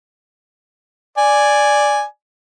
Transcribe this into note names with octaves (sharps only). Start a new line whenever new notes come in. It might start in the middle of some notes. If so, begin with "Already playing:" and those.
D5 G#5